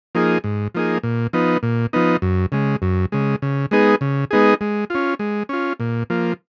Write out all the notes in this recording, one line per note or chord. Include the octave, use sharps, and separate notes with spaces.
F3 A#3 D#4 G#4
G#2
F3 A#3 D#4 G#4
A#2
F3 B3 D#4
A#2
F3 B3 D#4
F#2
C#3 G#3
F#2
C#3 G#3
C#3
G#3 B3 D#4 G#4
C#3
G#3 B3 D#4 G#4
G#3
C#4 F4
G#3
C#4 F4
A#2
F3 A#3